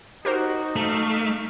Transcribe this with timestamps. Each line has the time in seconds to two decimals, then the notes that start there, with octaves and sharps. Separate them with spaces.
0.25 D#4 F#4 G4 A#4 C5
0.76 A3 F5